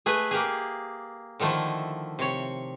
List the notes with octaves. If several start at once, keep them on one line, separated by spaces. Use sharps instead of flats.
A3 G#4 B4
A#3 G4 G#4
D3 D#3 F3 A3 E4
C3 C#5